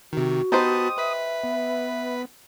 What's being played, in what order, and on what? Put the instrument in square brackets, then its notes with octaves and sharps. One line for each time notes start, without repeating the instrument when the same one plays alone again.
[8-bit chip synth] C3 D#3 [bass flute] F#4
[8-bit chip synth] B3 A5 B5 [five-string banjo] D#4 G4 C5 [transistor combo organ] D#6
[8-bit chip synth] B4 B6 [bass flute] E5
[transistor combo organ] B3